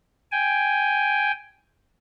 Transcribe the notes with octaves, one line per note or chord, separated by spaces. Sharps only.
G5 G#5